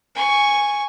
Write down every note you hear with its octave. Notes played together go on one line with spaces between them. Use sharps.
G#5 C#6